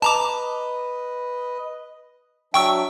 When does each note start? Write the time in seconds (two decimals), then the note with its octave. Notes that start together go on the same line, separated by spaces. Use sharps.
0.02 B4 D#5 A5 A#5 D6
2.54 F#3 D4 E5 G5 C#6 E6